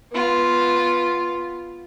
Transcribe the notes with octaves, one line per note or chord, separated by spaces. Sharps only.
B3 F4